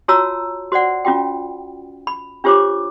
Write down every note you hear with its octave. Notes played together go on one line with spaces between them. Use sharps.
F4 F#4 C#5 A5 A#5 E6
F#4 C5 D5 F#5
C#4 F4 F#4 G5
B5
D4 F4 G4 C5 C#5 D6